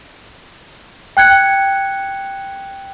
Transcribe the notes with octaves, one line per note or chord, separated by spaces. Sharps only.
G5 F#6 G#6 C#7